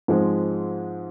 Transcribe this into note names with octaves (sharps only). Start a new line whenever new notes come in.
G#2 F3 G#3 C4